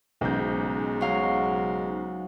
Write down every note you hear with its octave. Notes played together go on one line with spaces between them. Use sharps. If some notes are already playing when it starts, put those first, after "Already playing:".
B1 G#2 C#3 G6
F#3 F5